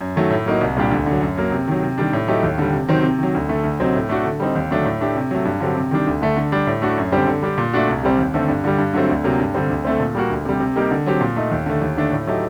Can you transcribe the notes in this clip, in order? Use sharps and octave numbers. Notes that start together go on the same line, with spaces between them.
F#2
D#3 F#3 A3
A2
F#3 A#3 D#4 F#4
C2
A#2 G3 D4 G4
D2
D3
F#3
F#2
F#3 A#3
C3
D#3 F#3
C3
D#3 G3 D4
A2
F#3 A3 D#4 G4
D#2
D3 G3
C3
D#3 F#3 C4
C3
D#3 F#3
D2
D3 A3
D2
C3 F#3 C4 D#4
A2
A3 D4 F#4
D3
G3 C4 D#4
D#2
D3 F#3 A3 D4
A2
A3 D4 G4
C3
F#3 A3
G2
D3 F#3 C4 G4
C3
D#3 G3 D4
D2
D3 A3
D3
G3 D4
A2
A3 D4 F#4
F#2
D3 G3 C4 G4
D3
G3 D4 G4
A#2
A3 D4 F#4
C2
C3 G3 C4
D#2
D3 A3 C4
G2
D3 G3
G2
D3 F#3 A3 C4
D2
C3 F#3 A#3
G2
D3 G3 C4
D2
D3 A3 C4
A#2
G3 A#3 F#4
D2
C3 G3
C3
G3 A#3 D#4 G4
D3
F#3 C4 G4
A#2
A3 D#4
D#2
D3 A3
D#2
D3 A3 D4
A2
F#3 A3 D#4 G4